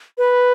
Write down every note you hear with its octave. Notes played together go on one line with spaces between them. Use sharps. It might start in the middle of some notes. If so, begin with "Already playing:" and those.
B4